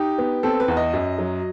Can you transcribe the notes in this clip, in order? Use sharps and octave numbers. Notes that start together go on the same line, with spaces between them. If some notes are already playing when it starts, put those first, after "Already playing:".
Already playing: D#4 G4
B3
C4 A4
B4
E2
D#5
F#2
F#3